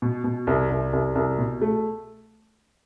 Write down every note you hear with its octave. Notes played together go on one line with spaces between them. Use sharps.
B2
B2
C2
C2
C2
C2
B2
A3